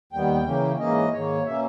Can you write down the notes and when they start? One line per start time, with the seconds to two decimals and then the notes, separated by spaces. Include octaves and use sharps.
0.12 D#2 D#3 G3 B3 G5
0.46 C#3 E3 A#3 C#4
0.79 G#2 E3 A#3 C#4 D#5
1.12 G#2 D#3 A#3 C#5
1.45 B2 A#3 C#4 E5